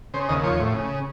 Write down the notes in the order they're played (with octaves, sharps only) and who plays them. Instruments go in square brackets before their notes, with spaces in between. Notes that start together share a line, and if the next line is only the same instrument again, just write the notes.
[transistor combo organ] C#3 C5
D#2 D#5
F3 C#5
A2
C#3